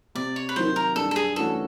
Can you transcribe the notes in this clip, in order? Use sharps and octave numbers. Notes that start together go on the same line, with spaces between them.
C3 D5
C#5
B4
D#3 F#3 C5
A#4
G2 A4
A4
G#4
E3 A3 C#4 F#4 A4